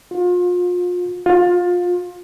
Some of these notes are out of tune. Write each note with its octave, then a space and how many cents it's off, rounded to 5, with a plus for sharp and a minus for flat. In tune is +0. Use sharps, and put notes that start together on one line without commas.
F4 +35
F4 +25